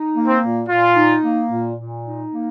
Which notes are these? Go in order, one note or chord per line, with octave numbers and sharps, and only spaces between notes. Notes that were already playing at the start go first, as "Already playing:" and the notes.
Already playing: D#4
A#3
C4
A#2
A#2 F4
D#4
A#3
A#2
A#2
D#4
A#3